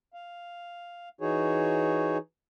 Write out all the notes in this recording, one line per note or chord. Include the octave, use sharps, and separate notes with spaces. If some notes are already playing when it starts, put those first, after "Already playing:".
F5
E3 D#4 F#4 G#4 C#5